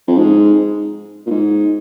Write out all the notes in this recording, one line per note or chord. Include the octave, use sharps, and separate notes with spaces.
F2
G#2
A#2
G#2